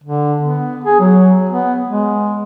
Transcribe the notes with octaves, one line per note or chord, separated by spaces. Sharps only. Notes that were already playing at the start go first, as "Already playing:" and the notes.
D3
B3
G#4
F#3
B3
G#3